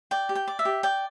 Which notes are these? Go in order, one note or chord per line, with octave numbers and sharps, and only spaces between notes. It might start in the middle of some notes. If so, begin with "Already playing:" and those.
D5 G5
G4
G5
D5
E5
G4
D5 G5